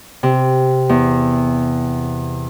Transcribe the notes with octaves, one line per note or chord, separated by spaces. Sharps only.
C3
E2